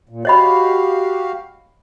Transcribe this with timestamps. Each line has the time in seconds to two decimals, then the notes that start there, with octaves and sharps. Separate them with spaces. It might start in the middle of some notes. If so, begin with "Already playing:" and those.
0.09 A#2
0.25 F#4 G4 C#5 D#5 F5 B5